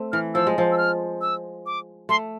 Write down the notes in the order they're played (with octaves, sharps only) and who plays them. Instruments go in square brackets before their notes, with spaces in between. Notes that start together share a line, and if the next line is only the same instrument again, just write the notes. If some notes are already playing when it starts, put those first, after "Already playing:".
Already playing: [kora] A3 C4
[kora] E3 [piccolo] F6
[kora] F3 [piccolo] E6
[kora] G#3
F3
[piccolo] E6
F6
E6
D6
[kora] A3 [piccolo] C6